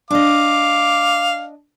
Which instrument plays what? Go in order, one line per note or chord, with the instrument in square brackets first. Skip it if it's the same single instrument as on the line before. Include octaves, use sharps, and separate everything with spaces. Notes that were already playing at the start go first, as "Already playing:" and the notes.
[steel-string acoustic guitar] D4 D#5 [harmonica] F5 D6